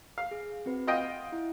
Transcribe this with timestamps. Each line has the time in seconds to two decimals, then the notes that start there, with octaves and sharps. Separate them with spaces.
0.18 F5
0.31 G#4
0.66 C4 F#4 B4
0.87 F4 D#5 F#5 G5
1.32 E4